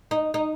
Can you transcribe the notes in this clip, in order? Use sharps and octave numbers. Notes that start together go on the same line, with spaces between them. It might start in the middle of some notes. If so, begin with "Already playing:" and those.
D#4
D#4